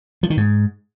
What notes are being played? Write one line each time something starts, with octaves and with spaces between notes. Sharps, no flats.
F3
D#3
G#2